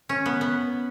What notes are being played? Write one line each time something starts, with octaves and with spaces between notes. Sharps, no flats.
C#4
B3
B3